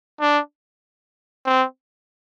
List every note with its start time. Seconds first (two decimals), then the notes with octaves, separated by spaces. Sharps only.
0.21 D4
1.46 C4